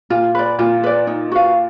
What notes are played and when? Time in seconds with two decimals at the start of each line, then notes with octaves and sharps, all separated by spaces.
0.10 A#2 F4
0.35 B4 D5
0.59 A#2 F4
0.84 B4 D5
1.07 D#4
1.32 F#4 B4 F5